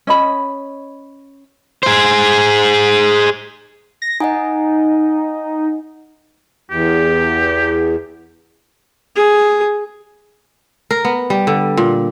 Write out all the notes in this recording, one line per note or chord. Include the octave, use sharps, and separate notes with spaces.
C#4 D#5 B5
G#4 C5
A#6
D#4 D#5 F#5 G#5
E2 G4
G#4
A#4
B3
G3
D3
A#2